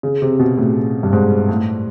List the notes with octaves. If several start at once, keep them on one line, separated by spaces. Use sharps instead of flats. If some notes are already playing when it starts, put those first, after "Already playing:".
C#3
C3
B2
A2
G2
G#2
A2